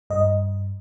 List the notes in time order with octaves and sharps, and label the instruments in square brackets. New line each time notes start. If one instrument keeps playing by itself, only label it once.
[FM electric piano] G2 D#5